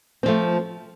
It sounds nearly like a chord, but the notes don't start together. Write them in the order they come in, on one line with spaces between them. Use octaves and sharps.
C4 F3 A3